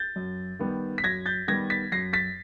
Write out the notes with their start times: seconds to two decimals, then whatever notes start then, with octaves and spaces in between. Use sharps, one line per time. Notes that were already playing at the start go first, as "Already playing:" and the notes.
Already playing: G6 A6
0.16 F#2
0.59 D#3 G3 B3
0.98 B6
1.04 F#2 G#6 A#6
1.26 G6 A6
1.48 D#3 G3 B3 G#6 A#6
1.70 A6 B6
1.92 F#2 A#6 C7
2.13 A6 B6